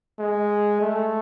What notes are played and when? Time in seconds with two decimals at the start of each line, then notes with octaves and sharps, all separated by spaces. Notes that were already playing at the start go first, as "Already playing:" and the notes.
0.19 G#3
0.81 A3